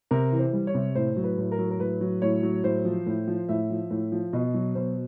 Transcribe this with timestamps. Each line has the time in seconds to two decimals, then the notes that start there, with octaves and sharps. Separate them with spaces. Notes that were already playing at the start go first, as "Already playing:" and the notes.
0.11 C3 A#4
0.32 E3
0.39 C5
0.53 G3
0.67 C#5
0.74 C3
0.95 A2 C5
1.17 F#3
1.24 B4
1.38 A2
1.52 A#4
1.59 F#3
1.71 A#4
1.80 A2 B4
2.01 F#3
2.22 A2 C#5
2.43 F#3
2.64 A2 C5
2.85 F3
3.06 A2
3.28 F3
3.49 A2 E5
3.70 F3
3.91 A2
4.12 F3
4.33 B2 D#5
4.54 F#3
4.75 B2 C5